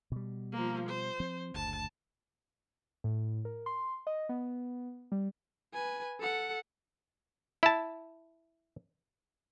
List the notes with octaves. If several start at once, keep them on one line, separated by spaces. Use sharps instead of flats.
B2 G3
F3 A#3
C5
F3 C4
F#1 D2 A5
A2
A#4
C6
D#5
B3
G3
B4 G#5
A4 F#5
E4 A5